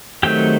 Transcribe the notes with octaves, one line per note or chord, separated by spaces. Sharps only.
D#3 F#3 A3 C4 G4 G5